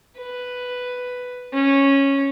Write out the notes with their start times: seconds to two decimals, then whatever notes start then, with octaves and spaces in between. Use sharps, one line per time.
0.18 B4
1.53 C#4